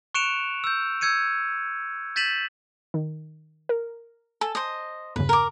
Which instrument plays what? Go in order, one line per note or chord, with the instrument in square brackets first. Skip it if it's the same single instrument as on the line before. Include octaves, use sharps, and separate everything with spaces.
[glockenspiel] C#6 F#6 C#7 D7 E7 F7
E6 G6
E6 G6 G#6 C#7 D#7
G6 A6 B6 D#7 E7 F#7
[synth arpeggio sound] D#3
A#4
[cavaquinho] A4 [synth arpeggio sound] G#5
[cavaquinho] C5 D#5
[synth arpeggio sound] E2 G2 C#3 [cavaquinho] B4
[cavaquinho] A#4 D6